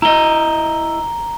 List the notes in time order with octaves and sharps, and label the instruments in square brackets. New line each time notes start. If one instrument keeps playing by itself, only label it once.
[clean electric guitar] E4 D#5 [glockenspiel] A#5 G7